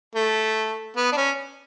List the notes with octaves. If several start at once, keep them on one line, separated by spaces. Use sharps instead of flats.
A3
B3
D4
C#4